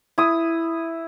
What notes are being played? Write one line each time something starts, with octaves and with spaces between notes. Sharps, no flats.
E4 D#6